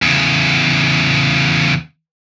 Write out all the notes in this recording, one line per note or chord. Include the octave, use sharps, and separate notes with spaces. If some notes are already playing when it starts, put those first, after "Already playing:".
E2 C#3